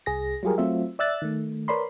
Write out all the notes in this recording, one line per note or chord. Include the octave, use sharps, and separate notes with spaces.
C2 G#4 A#6
F#3 G3 F4 G4 G#4 A#4
F#3 A3 C4 F4 E5
D5 E5 E6 F#6 A6
D#3 A3
A#4 B4 C#5 D5 B5 C6